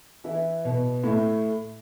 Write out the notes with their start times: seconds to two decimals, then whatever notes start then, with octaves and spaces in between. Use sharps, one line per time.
0.24 E3 E4
0.64 B2 B3
1.03 A2 A3